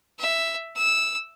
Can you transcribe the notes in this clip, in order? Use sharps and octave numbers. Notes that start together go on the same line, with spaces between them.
E5
E6